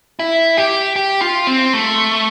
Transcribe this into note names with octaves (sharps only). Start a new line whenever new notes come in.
E4
G4
G4
F4
C4
A3